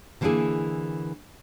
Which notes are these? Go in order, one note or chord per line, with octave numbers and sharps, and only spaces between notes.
D3 E3 A#3 C4 E4 G#4